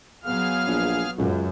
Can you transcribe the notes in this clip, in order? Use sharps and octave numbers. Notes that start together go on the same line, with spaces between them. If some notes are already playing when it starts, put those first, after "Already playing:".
F#3 B3 G#4 F5 F6
A#1
C#2 F#2 F#3